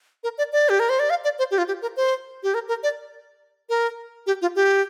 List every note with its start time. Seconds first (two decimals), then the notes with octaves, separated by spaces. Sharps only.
0.23 A#4
0.38 D5
0.52 D5
0.69 G4
0.79 A#4
0.89 C5
0.99 D5
1.10 F5
1.24 D5
1.39 C5
1.51 G4
1.58 F4
1.68 G4
1.82 A#4
1.96 C5
2.43 G4
2.54 A#4
2.68 A#4
2.83 D5
3.69 A#4
4.26 G4
4.42 F4
4.55 G4